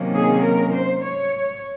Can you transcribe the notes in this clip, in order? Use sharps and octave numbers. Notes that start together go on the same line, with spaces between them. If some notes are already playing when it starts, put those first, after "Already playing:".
Already playing: C3 D#3 F#3 A#3 C#4
G#4
A#4
C5
C#5